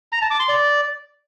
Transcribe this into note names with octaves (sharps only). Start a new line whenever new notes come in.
A#5
A5
D6
C6
D5